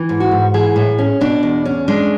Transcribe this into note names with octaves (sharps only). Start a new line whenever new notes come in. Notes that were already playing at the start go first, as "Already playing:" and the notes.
Already playing: E3
G#2
F#4
G#2
E3 G#4
A2
C#4
B2 D4
E2
C#4
G#3 D4